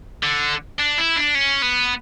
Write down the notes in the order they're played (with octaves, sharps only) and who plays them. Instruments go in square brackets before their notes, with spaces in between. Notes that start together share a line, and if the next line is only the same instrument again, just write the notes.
[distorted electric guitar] D3
D4
E4
D4
C#4
B3